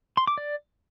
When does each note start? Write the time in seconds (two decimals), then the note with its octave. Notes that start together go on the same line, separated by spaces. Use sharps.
0.17 C6
0.27 D6
0.38 D5